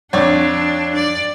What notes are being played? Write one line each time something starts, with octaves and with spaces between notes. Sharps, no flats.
F2 D4 C#5 D5
D5